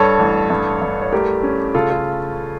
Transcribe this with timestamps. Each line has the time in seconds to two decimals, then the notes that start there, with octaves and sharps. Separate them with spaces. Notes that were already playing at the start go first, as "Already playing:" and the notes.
Already playing: G2 A4 C#5
0.19 A1
0.50 G2
0.82 G2
1.02 C#5
1.12 A3 G4 A#4
1.43 C#4
1.75 C#3 F4 A4
1.90 F4 A4